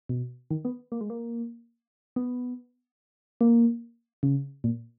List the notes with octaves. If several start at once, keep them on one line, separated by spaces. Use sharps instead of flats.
B2
D#3
B3
A#3
G#3
A#3
B3
A#3
C#3
A#2